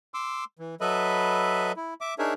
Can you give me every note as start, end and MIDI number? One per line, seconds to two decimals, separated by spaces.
0.14 0.44 84
0.14 0.44 86
0.14 0.44 88
0.59 0.75 52
0.81 1.72 54
0.81 1.72 69
0.81 1.72 71
0.81 1.72 75
0.81 1.72 76
0.81 1.72 83
1.77 1.94 64
2.01 2.14 76
2.01 2.14 86
2.19 2.34 62
2.19 2.34 63
2.19 2.34 68
2.19 2.34 70
2.19 2.34 73
2.19 2.34 76